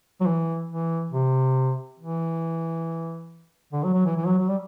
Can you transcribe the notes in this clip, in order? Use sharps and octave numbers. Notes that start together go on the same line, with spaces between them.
F#3
E3
E3
C3
E3
D3
F#3
F#3
E3
E3
F#3
F#3
G3